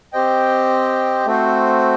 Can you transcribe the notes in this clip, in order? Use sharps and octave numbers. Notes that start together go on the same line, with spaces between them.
C4 G4 C5 D#5 G5
A3 C4 F#4 C5